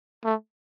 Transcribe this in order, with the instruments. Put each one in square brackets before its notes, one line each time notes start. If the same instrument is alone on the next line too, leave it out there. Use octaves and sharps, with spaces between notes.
[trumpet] A3